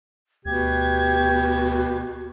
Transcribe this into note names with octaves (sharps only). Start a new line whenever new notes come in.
D2 B2 G4 G#6